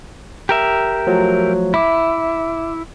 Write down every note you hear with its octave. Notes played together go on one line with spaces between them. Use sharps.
G4 A#4 E5
F3 F#3 A3
E4 E5 D6